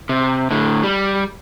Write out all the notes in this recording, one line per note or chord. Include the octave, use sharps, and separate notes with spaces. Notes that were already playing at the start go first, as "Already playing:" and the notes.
C3
A2 D3
G3